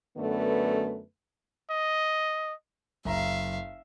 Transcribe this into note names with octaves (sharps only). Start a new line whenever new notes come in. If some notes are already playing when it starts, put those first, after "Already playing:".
F#2 D3 A3 B3 B4
D#5
F#1 E5 F5 A#5